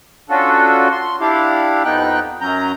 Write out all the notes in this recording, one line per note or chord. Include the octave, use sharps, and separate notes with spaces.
C#4 D4 F4 F#4 A4
C6
D4 E4 G4 F5
F2 B3 D#4 G5 F#6
F#2 F#3 C#4 A#5 G6